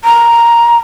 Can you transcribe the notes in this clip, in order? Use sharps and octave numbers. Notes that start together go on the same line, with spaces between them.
A#5